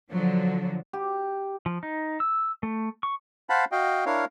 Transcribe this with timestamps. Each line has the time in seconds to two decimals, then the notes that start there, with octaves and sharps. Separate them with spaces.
0.11 D3 F3 F#3
0.93 G4
1.66 F3
1.83 D#4
2.20 E6
2.63 A3
3.03 C#6
3.49 C5 F5 F#5 A5 B5
3.72 F#4 D#5 F5 G5
4.06 D4 E4 A#4 C#5 F5